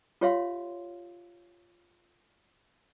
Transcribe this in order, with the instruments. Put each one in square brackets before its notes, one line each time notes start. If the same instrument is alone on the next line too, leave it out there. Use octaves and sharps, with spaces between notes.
[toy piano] F4 G4 C#5 E5 F5 C6